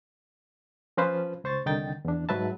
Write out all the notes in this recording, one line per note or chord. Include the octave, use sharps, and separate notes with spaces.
F3 C#4 F4 B4 C5
C#2 C5 C#6 A6
C2 D3 D#3 D#4 G5 A6
E2 D4
G#2 F#3 B4 E5 A5